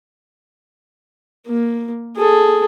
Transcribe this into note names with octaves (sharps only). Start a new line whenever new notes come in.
A#3
G#4 A4